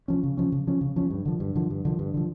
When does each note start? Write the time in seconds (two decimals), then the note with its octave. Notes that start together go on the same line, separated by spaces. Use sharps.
0.08 F3 C#4
0.23 C#3
0.37 F3 C#4
0.52 C#3
0.67 F3 C#4
0.81 C#3
0.96 F3 C#4
1.10 G2
1.25 D3 F3
1.40 G2
1.55 D3 F3
1.70 G2
1.85 D3 F3
1.99 G2
2.14 D3 F3